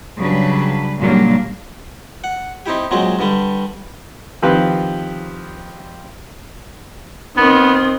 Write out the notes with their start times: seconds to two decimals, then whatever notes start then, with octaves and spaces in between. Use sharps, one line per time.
0.19 C#3 F#3 G3 D4 B4
1.01 A#2 C#3 F#3 G3 A#3 D4
2.24 F#5
2.66 C4 D#4 E4 G4
2.91 A#2 F#3 G#3 C4
3.19 G2 D3 G3
4.42 D#3 F3 C4 G4 B4
7.37 D#3 B3 C4